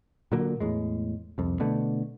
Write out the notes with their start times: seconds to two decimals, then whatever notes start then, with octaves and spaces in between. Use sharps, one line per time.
0.32 A#2 D3 F#3 A#3
0.60 E2 A2 G#3
1.38 C2 F2
1.60 B2 D3 A3